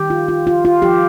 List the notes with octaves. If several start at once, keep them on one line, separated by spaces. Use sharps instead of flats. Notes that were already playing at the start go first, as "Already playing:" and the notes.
Already playing: D#3 G4
F4
F4
F4
F4
F3 G4